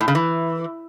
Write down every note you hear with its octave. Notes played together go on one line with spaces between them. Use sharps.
A2
C#3
E3